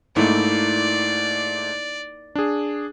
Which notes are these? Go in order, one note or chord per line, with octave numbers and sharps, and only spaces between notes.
G#2 A3 A#3 D#4 E4 D5
D4 G#4